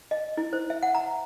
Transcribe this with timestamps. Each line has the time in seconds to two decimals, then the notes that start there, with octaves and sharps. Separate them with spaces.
0.11 D#5
0.37 E4
0.53 C5
0.70 E5
0.83 F#5
0.94 A#5